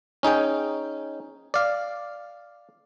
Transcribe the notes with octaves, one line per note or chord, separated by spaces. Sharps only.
C#4 D#4 G#4 G5
D5 F5